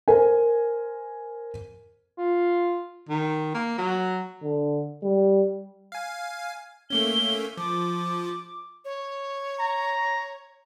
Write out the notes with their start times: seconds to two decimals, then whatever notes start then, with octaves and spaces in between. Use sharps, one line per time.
0.08 A#4 C5 G#5
2.18 F4
3.09 D#3
3.54 A#3
3.78 F#3
4.43 D3
5.03 G3
5.92 F5 G#5
6.90 A3 A#3 C#4 G7
7.57 F3 D6
8.85 C#5
9.60 A#5